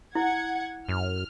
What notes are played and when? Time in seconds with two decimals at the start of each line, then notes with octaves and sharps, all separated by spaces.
0.15 E4 F#5 G#6
0.89 F#2 F6